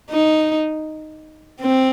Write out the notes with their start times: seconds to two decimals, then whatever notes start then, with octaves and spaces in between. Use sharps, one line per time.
0.10 D#4
1.61 C4